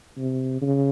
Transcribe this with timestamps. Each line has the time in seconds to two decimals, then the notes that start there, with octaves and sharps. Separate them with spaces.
0.17 C3
0.61 C#3